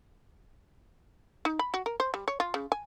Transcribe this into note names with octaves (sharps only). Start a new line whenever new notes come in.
D#4
B5
F#4
A#4
C5
G3
C#5
F4
C#3
G#5